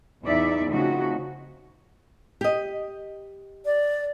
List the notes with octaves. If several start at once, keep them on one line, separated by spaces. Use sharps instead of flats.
E2 D#4 D5 E5
C#3 F3 A3 C4 D#4 F#4
G4 D#5
D5